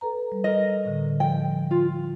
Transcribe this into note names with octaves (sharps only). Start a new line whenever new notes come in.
A4 B4 A#5
G3
A#4 D#5
A2 D3
F3 G5
F4